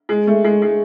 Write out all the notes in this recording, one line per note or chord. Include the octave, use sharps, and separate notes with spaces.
G#3
A3
G#3
G#3